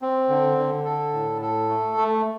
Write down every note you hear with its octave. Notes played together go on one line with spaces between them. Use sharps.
C4
D3
D3
A4
A2
A4
A3
A3